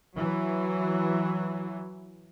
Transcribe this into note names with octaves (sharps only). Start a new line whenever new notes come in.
E3 F#3